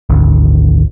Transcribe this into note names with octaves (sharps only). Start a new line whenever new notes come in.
G#1 D2